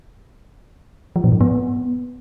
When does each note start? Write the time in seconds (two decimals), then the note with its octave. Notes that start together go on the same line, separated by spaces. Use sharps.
1.16 F3
1.24 A#2
1.32 G#2
1.41 B3